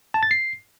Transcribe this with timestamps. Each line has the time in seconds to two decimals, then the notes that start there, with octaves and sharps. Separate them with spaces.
0.14 A5
0.23 A6
0.31 C7